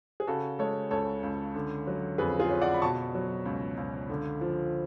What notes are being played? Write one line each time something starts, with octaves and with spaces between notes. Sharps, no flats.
G#4
C#3 F#4 A4
G#3 A4 C#5
C#2 A4 C#5
C#2
D3
F#3
F2 G#4 B4
F4 G#4
C#4
D5 F#5
B5
B2 A5 C#6
F#3
C#2
C#2
D3
F3